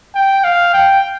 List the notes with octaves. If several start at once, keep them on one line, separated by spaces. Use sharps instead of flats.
G5
F5
G5